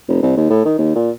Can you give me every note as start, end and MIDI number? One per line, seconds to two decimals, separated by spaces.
0.08 0.21 29
0.22 0.36 36
0.37 0.48 39
0.50 0.63 45
0.65 0.79 51
0.79 0.94 39
0.96 1.10 46